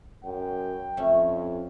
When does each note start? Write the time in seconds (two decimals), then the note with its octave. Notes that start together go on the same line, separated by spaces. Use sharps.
0.24 F#2 G5
0.97 F2 A3 C#4